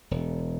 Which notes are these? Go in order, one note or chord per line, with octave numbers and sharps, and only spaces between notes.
E1